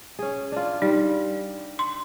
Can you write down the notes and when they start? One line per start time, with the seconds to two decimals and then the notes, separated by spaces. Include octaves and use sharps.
0.19 C#4 G#4
0.52 D4 F4
0.82 G3 D#4
1.79 C6